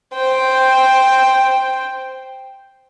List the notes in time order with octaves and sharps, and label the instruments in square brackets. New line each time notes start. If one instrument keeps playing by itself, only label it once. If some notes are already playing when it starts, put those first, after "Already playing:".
[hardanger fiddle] C5 G5